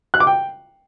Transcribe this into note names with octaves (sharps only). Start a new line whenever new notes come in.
F#6
D6
G5